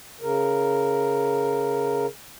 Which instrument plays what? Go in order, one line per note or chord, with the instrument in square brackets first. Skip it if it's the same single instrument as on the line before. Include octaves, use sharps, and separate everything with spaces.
[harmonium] C#3 A#4